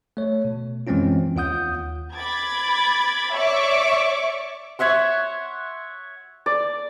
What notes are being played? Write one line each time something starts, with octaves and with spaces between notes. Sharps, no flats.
A3 C#5
B2
F#2 E3 G#3 C4 C#4 F4
D#2 F4 F#5 D#6 G6
B5 D6 G#6 A6
C#5 D5 E5 C#6 D6
C#5 E5 F#5 C6
D5